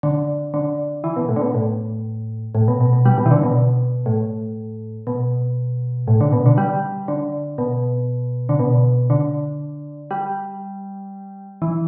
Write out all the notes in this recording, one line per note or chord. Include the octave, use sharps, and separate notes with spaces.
D3
D3
E3
B2
A2
D3
B2
A2
A2
B2
B2
B2
G3
B2
E3
D3
B2
A2
B2
A2
D3
B2
D3
G3
D3
B2
D3
B2
D3
G3
E3